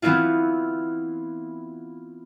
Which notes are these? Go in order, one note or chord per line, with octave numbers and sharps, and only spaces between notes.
E3 B3 C4 E4 F4